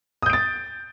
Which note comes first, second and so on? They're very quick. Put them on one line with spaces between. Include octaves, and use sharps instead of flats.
D#6 G6 D7 A6